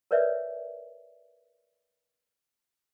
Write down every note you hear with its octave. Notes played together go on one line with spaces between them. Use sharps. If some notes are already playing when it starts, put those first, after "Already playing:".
A#4 B4 C#5 D5 E5